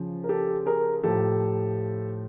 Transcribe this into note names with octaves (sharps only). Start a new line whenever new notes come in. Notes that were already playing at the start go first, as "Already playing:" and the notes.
Already playing: C#3 F3
A#4
G4 A4
G#4 A#4
A2 F3 G4 A4